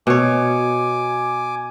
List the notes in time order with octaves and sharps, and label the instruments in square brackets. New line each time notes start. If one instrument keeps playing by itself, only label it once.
[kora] B2 C#5 [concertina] G#5 D6